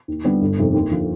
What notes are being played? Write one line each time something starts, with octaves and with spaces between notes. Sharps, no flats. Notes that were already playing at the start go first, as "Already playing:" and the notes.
D#2
D3 G3 B3
G1
F2 C3 D#3
D#2
D3 F3